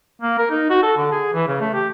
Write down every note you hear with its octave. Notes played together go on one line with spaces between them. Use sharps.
A#3
A#4
D#4
F#4
A4
D3
G#4
E3
C#3
A3
G4